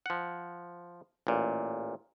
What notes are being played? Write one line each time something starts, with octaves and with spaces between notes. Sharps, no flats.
F3 F#5
A1 A#2